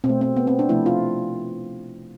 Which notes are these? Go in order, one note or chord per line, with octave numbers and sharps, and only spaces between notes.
B2 C4
A3
C4
B3
C4
D4
C3 F3 A3 E4
F4